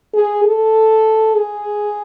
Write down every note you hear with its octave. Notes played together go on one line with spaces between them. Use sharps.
G#4
A4
G#4